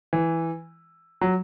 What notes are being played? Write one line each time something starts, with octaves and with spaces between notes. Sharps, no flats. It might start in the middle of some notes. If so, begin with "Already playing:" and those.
E3
F#3